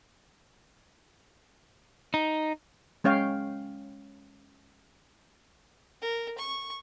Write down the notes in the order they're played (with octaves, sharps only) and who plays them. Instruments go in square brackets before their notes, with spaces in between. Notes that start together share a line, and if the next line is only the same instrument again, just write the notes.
[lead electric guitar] D#4
[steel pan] G#3 C#4 C#5 F5 G5
[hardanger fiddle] A#4
C#6